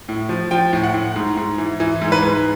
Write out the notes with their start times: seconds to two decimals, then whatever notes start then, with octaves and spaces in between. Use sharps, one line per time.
0.09 A2
0.29 F3
0.51 F3 G5
0.73 A2
0.84 F#5
0.94 A2
1.16 G#2
1.37 G#2
1.58 E3
1.80 E3
2.02 G#2
2.12 B4
2.23 G#2